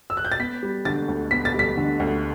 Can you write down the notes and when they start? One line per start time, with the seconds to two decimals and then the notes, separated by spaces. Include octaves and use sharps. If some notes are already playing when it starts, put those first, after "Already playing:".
0.10 E6
0.17 F#6
0.25 G6
0.32 A6
0.40 B3 B6
0.63 G3
0.85 D3 A6
1.08 D2
1.31 B3 B6
1.45 A6
1.54 G3 B6
1.77 D3
2.00 D2